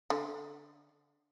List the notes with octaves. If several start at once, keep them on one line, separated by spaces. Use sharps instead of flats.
D3